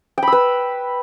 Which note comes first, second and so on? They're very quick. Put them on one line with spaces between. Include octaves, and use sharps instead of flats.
G5 B5 E6 B4